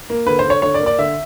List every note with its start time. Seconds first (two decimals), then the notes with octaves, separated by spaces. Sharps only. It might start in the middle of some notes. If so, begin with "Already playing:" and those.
0.10 A#3
0.27 D3 B4
0.39 C5
0.45 D3 C#5
0.62 D3 C#5
0.74 D5
0.80 A#3
0.86 D5
0.99 D3 E5